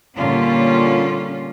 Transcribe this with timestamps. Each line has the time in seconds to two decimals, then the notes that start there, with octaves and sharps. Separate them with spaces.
0.16 A#2 D3 G3 C#4 F4